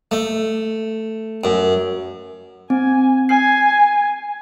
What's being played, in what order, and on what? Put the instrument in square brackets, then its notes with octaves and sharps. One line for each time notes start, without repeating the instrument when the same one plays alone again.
[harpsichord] A3
F#2
[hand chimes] C4 [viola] G#5
[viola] G#5 [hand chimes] C7